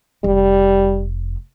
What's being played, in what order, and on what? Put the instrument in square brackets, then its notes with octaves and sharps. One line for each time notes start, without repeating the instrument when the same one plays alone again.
[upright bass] F1 [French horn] G3